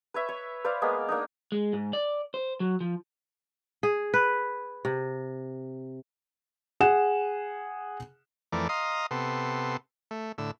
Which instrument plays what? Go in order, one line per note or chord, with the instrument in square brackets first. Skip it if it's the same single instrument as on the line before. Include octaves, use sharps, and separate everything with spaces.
[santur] B4 C#5 E5
C#5
B4 C5 D5 F5
G#3 A#3 B3
A#3 D4 D#4
[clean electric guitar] G#3
G#2
D5
C5
F#3
F3
[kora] G#4
B4
C3
[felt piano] G#4 F#5 E7
[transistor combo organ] F2 E3 A3 A#4 D5
D#5 F5 A#5 C6 D#6
C3 B3 A4 C6
A3
A2 D3 E6